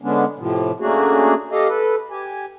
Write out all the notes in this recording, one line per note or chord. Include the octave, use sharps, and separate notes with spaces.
D3 G#3 B3 C#4 D4
A2 C3 F3
A3 A#3 C#4 D4 F#4 G#4
G4 A4 D#5 F5
A4 B4
G4 G#5